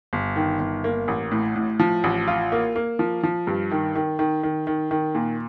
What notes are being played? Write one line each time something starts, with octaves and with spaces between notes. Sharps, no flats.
G1
D#3
G1
A#3
A1
A2
A2
F3
A1
F4
A#3
A#3
F3
F3
G2
D#3
D#3
D#3
D#3
D#3
D#3
A#2